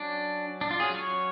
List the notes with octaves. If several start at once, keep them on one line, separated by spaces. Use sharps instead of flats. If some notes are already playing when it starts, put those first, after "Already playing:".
Already playing: F#3 C#4 D4
D4
F4
F#3 C#4 G#4
C#5